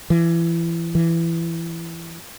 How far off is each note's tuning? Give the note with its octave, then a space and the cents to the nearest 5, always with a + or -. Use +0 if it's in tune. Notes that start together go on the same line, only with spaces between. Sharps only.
E3 +25
E3 +20